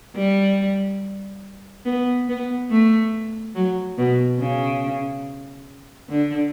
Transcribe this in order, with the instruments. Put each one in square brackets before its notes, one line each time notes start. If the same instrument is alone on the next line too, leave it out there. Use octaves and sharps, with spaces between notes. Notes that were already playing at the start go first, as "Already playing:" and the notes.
[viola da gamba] G3
B3
B3
A3
F#3
B2
C#3
D3